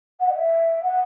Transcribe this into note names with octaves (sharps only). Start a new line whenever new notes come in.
F#5
D#5
E5
F#5